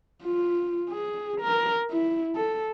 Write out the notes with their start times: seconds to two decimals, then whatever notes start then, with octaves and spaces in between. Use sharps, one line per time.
0.23 F4
0.90 G#4
1.41 A#4
1.91 E4
2.36 A4